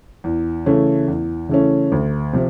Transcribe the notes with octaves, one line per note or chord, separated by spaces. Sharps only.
E2
C#3 E3 A3 C#4
E2
C#3 E3 A3 C#4
D2
C3 F3